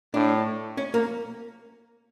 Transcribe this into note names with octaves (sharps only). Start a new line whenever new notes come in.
A2 D4
C#4
A#3